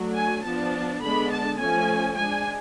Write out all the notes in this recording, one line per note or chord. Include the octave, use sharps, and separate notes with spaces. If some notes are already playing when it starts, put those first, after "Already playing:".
Already playing: F#3 A3 D4
G#5
F3 B3 D4 A5
D3 G#3 B3 D4 B5
A5
F3 A3 C#4 G#5
G#3 D4 G#5